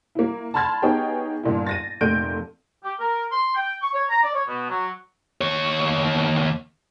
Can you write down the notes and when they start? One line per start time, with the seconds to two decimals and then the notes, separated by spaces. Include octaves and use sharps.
0.15 A#3 E4
0.54 A5 B5 C6 F6 G#6 A6
0.82 B3 D#4 G4 G#4 C#5 G5
1.43 G1 A#2 E4
1.67 A6 A#6 D#7
2.01 F1 A#2 A3 G6 D7 D#7
2.84 G4
3.00 A#4
3.32 C6
3.56 G5
3.82 C#6
3.94 C#5
4.10 A#5
4.23 D5
4.35 C#5
4.48 B2
4.70 F#3
5.41 D#2 C#5